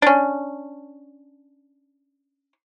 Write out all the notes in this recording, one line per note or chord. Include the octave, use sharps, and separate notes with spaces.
C#4 D4